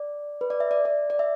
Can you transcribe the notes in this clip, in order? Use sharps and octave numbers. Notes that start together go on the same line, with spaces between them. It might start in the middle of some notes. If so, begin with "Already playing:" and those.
Already playing: D5
B4
D5
E5
D5
D5
D5
E5